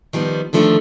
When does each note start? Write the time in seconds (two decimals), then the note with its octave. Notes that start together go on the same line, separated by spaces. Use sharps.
0.13 D#3 F3 G3 B3
0.53 D3 D#3 F3 A3 B3 D4